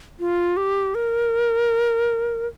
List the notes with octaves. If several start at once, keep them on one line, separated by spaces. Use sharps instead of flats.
F4
G4
A#4